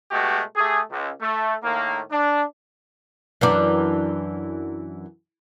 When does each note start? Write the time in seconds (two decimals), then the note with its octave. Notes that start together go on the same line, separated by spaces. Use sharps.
0.11 B2 G#3 A3 F#4 G4
0.56 A3 G4 G#4
0.91 C#2
1.20 A3
1.63 A2 D#3 A#3
2.12 D4
3.41 F#2 E3 D4